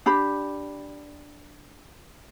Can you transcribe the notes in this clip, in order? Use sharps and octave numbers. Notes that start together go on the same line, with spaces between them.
D4 G4 B5